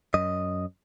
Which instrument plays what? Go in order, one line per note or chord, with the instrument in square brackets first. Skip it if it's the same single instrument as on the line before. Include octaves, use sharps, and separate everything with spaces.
[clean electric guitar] F#2 D#5